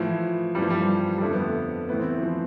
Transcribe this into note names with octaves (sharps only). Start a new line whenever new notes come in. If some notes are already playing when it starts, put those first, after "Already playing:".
Already playing: A2 E3 F3
G2 E3 F3 G3
G3
G3
F2 D3 A3
B3
A3
A2 E3 B3
C4
E3
F3